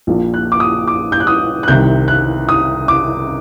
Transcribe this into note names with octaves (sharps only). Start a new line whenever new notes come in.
A#1 A#2
F#6
D6
D#6
D6
G6
F#6
D#6
F#6
C2 C3 D#3 G6
F#6
D#6
D6